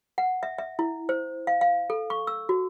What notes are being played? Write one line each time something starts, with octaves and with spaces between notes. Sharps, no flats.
F#5
E5
E5
E4
C5
F5
F5
A4
C#6
E6
F#4